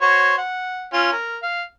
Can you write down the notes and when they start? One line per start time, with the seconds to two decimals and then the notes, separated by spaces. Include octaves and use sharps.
0.02 F#4 C5 C#5
0.38 F#5
0.93 C#4 F4
1.12 A#4
1.43 F5